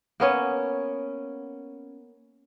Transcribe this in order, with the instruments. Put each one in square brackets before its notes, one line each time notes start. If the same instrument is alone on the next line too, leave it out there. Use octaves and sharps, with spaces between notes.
[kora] A#3 B3 C#4